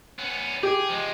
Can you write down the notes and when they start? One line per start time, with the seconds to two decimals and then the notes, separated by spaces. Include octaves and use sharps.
0.19 B3 C#4
0.63 G4 G#4
0.89 F3 G#3